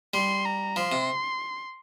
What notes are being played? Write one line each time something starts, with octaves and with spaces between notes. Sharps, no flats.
G3 C6
A#5
F3 C6
C3